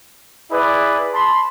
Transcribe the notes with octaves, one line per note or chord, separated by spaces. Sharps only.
E4 G#4 B4 D5
A5 B5 C6